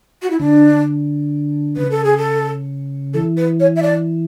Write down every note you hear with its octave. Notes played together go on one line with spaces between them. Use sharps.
F#4
E4
D3 D4
C#3 B4
A4
G#4
A4
E3 A4
B4
C#5
E5
D5